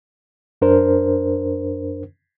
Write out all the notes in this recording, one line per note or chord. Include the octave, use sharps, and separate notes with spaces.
F#2 D4 A#4 C5